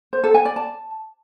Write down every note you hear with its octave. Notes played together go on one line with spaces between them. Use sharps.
C5
A4
G#5
D5
A5